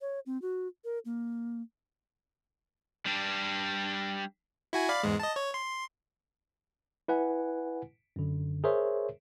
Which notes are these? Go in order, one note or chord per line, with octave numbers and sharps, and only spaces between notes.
C#5
C4
F#4
A#4
A#3
G3 D4
E4 F#4 G#5
D5 F5 B5
E2 G#2 G#3
D#5 A5
C#5
C6
E4 B4 F#5 G#5
F#2 D3
G#4 A#4 C5 C#5 E5